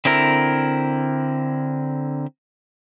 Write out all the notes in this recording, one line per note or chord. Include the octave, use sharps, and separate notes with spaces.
D3 C4 E4 A#4